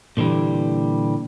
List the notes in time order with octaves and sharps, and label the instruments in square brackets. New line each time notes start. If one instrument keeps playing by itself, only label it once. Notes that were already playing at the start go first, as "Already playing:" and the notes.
[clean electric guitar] A#2 D3 E3 G3